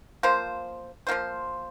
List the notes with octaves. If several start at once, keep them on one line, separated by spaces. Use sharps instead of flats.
F3 A#3 F4 C5
F3 A#3 F4 C5